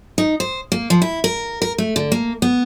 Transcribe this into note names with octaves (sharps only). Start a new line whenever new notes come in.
D#4
C5
A#3
F3
E4
A#4
A#4
A3
D3
A#3
B3